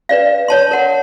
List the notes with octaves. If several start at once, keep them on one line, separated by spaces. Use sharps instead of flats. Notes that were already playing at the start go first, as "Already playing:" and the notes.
B4 D5 F5
C#5 A5 C6
A#4 F#5